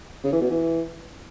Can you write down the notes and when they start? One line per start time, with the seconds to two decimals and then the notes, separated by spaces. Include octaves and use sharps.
0.24 C#3
0.33 E3
0.41 B2
0.50 E3